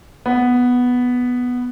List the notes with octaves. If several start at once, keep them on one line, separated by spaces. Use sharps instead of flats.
B3